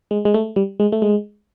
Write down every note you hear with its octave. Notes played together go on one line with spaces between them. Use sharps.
G#3
G#3
A3
G3
G#3
A3
G#3